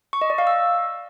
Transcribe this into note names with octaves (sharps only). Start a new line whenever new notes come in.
C#6
D#5
D5
F5
E6